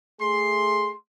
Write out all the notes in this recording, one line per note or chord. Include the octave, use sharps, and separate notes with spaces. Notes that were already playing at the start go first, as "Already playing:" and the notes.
A3 G#4 C6